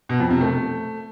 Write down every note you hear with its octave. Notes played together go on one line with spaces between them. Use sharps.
B2
F2
C3
A3